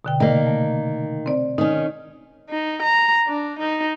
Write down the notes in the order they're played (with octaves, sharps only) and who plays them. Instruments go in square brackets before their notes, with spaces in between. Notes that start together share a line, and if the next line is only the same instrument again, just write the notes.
[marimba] B2 D3 G5
[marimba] C3 D5 [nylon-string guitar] D#3 A#3
[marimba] A3
C4 C5 D5
[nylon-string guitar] D#3 C#4 [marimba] D#4
[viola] D#4
A#5
D4
D#4